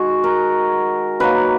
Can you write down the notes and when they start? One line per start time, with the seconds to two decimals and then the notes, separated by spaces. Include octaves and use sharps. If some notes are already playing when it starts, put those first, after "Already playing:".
Already playing: D#3 G#3 F#4 G#4
0.24 A#4
1.20 D#3 F#3 A#3 B4